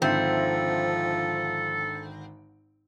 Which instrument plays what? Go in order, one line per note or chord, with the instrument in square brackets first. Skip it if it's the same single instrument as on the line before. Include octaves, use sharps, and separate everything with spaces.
[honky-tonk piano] G#1 D3 E5 [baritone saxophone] F3 [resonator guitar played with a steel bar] C4 [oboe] A4